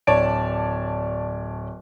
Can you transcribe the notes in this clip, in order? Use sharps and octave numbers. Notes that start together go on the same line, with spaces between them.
D1 C#5 D5 A5 D7